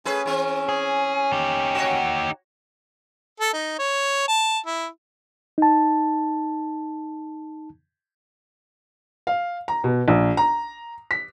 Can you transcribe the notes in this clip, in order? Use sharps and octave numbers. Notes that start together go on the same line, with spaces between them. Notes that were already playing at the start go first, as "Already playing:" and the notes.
A3 C#4 G#4 B4
E3 C4
G#4
D#4 G4
F#4 C#5
A4
D#4
C#5
A5
E4
D#4 A5
F5
A#5
B2
A#1
A#5
B6